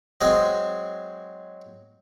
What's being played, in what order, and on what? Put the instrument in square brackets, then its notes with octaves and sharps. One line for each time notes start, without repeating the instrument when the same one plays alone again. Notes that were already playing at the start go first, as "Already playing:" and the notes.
[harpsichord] F#3 G#3 C4 D#5